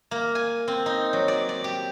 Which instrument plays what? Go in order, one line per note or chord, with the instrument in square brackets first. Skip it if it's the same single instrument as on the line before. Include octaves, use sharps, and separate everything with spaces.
[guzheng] A#3
G#5
C4
D#4
F#3
D5
D5
G4